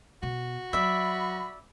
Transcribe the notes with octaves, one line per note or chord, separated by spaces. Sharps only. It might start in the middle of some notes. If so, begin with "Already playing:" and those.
B2 F#4
F#3 D5 E5 B5